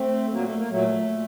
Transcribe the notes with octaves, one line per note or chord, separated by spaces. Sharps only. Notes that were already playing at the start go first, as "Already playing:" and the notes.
Already playing: A3 C4
A#2 F#3 A#3
A3
A#3
A#2 F#3 A3
A#2